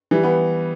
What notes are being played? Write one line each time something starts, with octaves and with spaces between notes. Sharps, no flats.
E3 G3
G3 B3